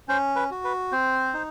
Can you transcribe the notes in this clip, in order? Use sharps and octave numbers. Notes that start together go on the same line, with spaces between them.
C#4 C5
B4
F#4
B4
C4 C5
D#4